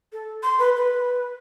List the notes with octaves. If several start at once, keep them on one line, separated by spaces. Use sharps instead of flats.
A4
C6
B4
B4